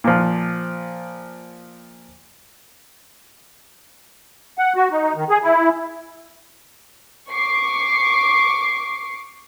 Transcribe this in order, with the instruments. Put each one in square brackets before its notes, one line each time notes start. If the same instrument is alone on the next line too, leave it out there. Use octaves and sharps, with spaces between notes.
[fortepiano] A#2 F3
[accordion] F#5
F#4
D#4
D#3
G#4
E4
[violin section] C#6 D6 C7